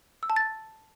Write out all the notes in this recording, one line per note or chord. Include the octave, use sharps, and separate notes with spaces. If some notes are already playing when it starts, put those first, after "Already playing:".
E6
A5
A6